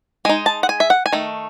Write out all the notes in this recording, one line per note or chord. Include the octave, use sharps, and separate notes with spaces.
G#3 D#4 G#5
A5
F#5
G#5
E5
F#5
G#5
D#3 A3